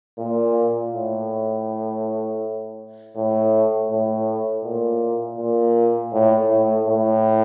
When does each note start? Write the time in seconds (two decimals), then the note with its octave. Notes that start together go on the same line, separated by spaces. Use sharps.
0.18 A#2
0.93 A2
3.16 A2
3.90 A2
4.64 A#2
5.38 A#2
6.13 A2
6.50 A2
6.87 A2